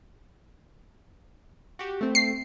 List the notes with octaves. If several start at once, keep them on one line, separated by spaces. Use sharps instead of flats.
F#4 G4
A3 C4
C7